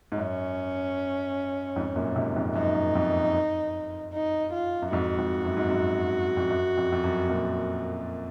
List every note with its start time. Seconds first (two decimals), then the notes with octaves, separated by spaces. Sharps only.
0.12 G#2
0.18 F#2 C#4
1.76 F2 G#2
1.96 F#2 A#2
2.16 G#2 C3
2.36 F2 G#2
2.55 F#2 D#4
2.75 F#2
2.95 F2
4.14 D#4
4.53 F4
4.82 F#2
4.92 F2 G#2 F#4
5.18 F2 G#2
5.45 F#2
5.57 G#2
5.70 F#2
6.37 F2
6.50 F#2
6.77 F2
6.92 F2
7.04 F#2
7.29 F#2 A#2